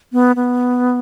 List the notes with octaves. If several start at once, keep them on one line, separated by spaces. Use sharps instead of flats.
B3
B3